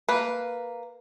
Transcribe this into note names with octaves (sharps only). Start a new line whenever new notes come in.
A#3 B4